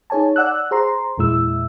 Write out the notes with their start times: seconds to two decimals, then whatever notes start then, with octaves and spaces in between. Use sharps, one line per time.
0.10 D#4 G#4 C#5 G#5 A5
0.36 D5 F#5 E6 F#6
0.71 G#4 C5 A#5 C6
1.18 E2 A#2 G#3 E4 E6